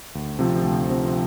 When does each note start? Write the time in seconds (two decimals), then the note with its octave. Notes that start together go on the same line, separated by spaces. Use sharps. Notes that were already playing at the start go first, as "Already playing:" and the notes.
0.15 D2
0.39 C3 F3 C4
0.63 D2
0.89 C3 F3 C4